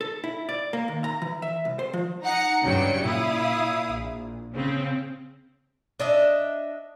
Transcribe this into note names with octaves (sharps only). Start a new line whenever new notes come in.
A4
E4
D5
A#3
D#2
A#5
E3
E5
C2
C5
F3
D#4 F#5 A#5 C#7
G2 C#3 F#3 D5 G5 C#7
A#2 E4 F5 D#6
A#1
C#3 C4
D4 D#5 E5